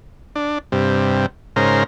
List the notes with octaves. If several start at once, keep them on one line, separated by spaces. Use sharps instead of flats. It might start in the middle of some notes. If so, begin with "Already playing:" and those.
D4
G2 C3
G#2 C#3 A#4 C5